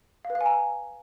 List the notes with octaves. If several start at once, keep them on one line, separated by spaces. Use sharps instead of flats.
F5
B4
F5
G#5
A#5